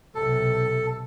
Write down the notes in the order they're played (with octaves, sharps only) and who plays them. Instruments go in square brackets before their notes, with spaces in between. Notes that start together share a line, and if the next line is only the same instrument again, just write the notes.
[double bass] B1 C3 [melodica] A4